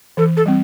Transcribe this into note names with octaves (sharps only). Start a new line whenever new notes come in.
E3 A4
A4
G3 C4